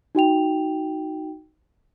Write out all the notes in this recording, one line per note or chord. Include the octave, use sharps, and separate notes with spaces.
D#4 F#4 G5 F7